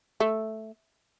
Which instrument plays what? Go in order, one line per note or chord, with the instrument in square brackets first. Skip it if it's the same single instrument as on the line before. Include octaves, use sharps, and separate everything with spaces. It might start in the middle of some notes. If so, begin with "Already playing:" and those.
[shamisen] A3